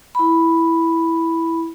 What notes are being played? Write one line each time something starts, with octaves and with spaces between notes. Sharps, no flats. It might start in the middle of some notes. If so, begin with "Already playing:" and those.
E4 B5